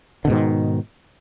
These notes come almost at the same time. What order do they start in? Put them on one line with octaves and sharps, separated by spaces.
D3 B2 G#2 D#3